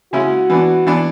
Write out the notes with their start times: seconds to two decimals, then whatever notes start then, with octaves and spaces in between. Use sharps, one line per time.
0.13 C#3 G#3 C#4 E4 F#4
0.50 E3 B3 D4
0.87 E3 B3 D4